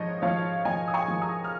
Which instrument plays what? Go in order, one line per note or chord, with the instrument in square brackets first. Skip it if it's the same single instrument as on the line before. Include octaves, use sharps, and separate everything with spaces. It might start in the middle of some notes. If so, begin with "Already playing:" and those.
Already playing: [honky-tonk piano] G#2 F3 C#5 D#5
F3 C#5 F5
F3 D#5 G#5
D#6
G#5 C#6
F3
A#5 D#6
F6